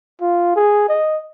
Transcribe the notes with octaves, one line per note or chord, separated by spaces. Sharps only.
F4
G#4
D#5